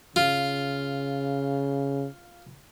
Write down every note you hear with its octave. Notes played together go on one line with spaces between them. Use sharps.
C#3 F4